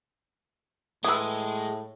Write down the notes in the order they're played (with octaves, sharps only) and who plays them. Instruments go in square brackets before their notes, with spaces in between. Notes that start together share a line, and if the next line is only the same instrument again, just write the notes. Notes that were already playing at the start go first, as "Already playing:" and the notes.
[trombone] A2 [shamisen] E3 B4 [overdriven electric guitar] G#3 [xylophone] D#6 E6